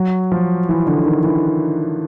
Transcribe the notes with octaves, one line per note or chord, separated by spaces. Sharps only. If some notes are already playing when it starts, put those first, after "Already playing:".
Already playing: F#3
F3
E3
D3
D#3
E3